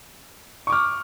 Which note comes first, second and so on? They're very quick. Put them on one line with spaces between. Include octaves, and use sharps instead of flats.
C#6 D6 F6